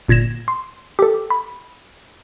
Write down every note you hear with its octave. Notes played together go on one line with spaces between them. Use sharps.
G1 A#2 G#6 A#6 E7
C6
G4 A4
B5